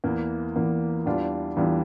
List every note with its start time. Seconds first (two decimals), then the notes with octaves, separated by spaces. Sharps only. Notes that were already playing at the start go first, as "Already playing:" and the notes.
0.04 E2 E3 A#3
0.56 E2 E3 A#3
1.06 E2 E3 G3 D4 F4
1.57 E2 E3 G3 D4 F4